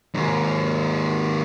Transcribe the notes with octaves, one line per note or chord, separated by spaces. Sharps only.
D#2 G#2